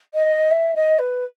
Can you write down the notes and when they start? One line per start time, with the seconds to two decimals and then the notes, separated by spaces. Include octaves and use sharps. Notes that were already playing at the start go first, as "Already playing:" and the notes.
0.14 D#5
0.51 E5
0.75 D#5
0.99 B4